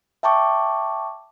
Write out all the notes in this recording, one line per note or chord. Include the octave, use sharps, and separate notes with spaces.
E5 G5 A5 C#6 D6